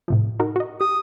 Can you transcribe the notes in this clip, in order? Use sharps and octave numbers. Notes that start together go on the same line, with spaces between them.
A2 C3 F3
D#4 F#4 A#4
F#4 D#5
G4 D#6